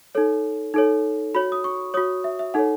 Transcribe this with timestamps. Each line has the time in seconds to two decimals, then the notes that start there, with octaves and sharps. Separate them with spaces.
0.15 D#4 A4 C#5
0.74 D#4 A4 C#5
1.35 F#4 C#5 B5
1.52 D#6
1.64 C#6
1.94 C#5 D#6
1.97 F#4
2.24 E5
2.39 E5
2.54 D#4 A4 C#5 F#5